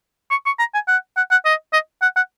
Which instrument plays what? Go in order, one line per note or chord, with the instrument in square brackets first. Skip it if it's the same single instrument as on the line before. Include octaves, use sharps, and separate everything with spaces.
[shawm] C#6
C#6
A#5
G#5
F#5
F#5
F#5
D#5
D#5
F#5
F#5